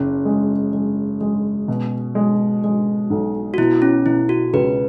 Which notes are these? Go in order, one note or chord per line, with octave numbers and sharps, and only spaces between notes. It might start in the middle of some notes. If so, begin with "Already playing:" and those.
Already playing: F#1 C#4
G#3
G#3
G#3
B2
G#3
G#3
B1
F#4
B2 E4
C#4
B2 E4
F#4
C#2 B4